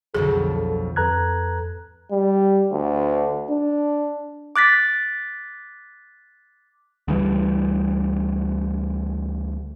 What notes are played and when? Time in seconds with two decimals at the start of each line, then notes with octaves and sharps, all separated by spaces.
0.14 B1 F2 D3 G#4 A4
0.96 F2 A4 B4 A#5 F#6 G#6
2.12 G3
2.72 D2
3.51 D4
4.56 D6 F#6 A6 B6
7.08 D2 C#3 E3 G3